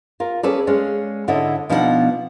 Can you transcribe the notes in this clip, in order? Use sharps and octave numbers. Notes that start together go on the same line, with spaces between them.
F4 A#4
C#4 G#4 A4 B4 D5
G#3 C#4 D5 F5
G#2 D3 E4 A4 C#5 D#5
B2 F3 D4 D#4 C5 F#5